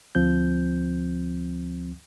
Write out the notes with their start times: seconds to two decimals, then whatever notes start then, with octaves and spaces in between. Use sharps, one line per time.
0.15 D2 F3 C4 G6